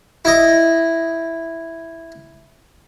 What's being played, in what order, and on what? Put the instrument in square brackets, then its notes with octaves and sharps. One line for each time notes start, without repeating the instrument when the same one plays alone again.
[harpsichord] E4 D#5